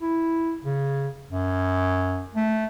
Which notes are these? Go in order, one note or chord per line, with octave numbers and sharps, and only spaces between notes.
E4
C#3
F#2
A3